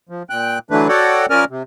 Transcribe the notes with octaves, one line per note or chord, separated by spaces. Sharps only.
F3
A#2 G5 F#6
D3 E3 F#3 A3 D4 B4
F#4 A4 C#5 D5 F#5 G5
F3 C#4 A#4 D5 G#5 F6
C3